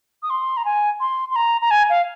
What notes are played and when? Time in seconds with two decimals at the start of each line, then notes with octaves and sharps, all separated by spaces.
0.23 D#6
0.30 C6
0.57 A#5
0.65 G#5
1.00 C6
1.31 C6
1.36 A#5
1.61 A#5
1.71 G#5
1.90 F5